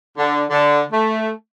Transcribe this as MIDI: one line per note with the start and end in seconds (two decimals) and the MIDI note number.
0.18 0.44 50
0.51 0.81 50
0.92 1.30 57